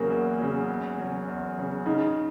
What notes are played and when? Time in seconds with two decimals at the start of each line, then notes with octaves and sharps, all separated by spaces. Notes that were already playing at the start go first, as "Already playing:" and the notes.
Already playing: E2 C#3 F#3 A#3
0.10 E2
0.39 C#3 F#3
0.69 E2
0.98 C#3 F#3
1.28 E2
1.57 C#3 F#3
1.86 C#3 D#4